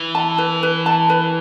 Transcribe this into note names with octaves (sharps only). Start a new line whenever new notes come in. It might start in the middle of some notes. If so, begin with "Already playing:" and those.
Already playing: E3
A5
B4
B4
A5
B4